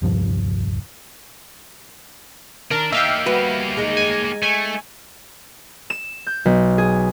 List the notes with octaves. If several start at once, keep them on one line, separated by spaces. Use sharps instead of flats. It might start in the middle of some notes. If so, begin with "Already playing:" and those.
D#1 C2 G2 F3
D#3 D4 A#4
A#3 D#4 G4 E5 F5 G5
G3 F#4 B4
G#3 D#4
G#5
A3 G#5
E7
G6
B1
G#4